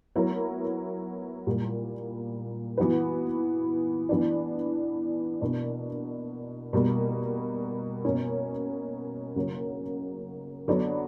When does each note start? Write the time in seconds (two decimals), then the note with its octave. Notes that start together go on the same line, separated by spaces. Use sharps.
0.16 F#3 B3 E4 A#4
1.47 A#2 G3 A#3
2.78 E3 B3 F#4 B4
4.09 E3 B3 D4
5.41 B2 A#3 D4
6.73 B2 G3 A#3
8.05 B2 A#3 C#4
9.36 C#3 F#3 A#3 C#4
10.68 D3 F#3 B3 D4